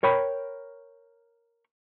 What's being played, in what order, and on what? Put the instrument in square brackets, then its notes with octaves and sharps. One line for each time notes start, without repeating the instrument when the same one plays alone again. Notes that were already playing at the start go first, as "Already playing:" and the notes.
[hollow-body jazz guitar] A#4 C#5 G5 B5